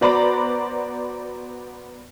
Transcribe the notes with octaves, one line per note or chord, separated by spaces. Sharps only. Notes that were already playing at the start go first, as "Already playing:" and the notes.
B3 F#4 C5 D5 A#5 B5